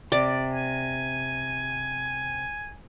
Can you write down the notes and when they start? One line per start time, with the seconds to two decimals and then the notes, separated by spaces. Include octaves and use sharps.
0.12 C3 D5
0.51 G#5